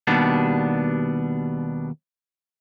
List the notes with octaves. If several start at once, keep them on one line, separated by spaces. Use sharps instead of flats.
D#2 B2 G3 B3 D4